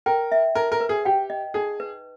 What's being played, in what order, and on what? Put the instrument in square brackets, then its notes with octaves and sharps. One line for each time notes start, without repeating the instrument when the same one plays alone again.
[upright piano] A#4 [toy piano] G5
[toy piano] E5
[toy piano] D#4 [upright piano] A#4
[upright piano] A#4
[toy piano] B4
[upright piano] G#4
[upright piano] G4 [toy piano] G5
[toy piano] D#5
[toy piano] D#4 [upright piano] G#4
[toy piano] B4